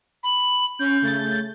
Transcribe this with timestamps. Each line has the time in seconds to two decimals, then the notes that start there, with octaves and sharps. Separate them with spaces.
0.23 B5
0.79 C#4 C#5 G6
1.02 C#3 A3 A6